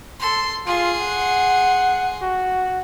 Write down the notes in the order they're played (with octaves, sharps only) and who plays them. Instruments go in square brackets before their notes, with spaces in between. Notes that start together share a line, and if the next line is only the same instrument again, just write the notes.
[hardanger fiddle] A4 C6
[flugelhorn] F4 [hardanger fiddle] G#4 C6
[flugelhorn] F#5
F#4